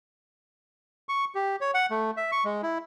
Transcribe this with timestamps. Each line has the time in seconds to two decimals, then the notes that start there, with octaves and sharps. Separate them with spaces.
1.09 C#6
1.35 G4
1.61 C#5
1.74 F#5
1.91 A3
2.17 E5
2.32 C#6
2.45 G#3
2.63 E4